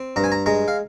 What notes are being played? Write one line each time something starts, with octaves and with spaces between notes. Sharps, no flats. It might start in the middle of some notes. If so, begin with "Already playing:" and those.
Already playing: C4
G2 A#5
G#5
A#5
G#3 A#5
F5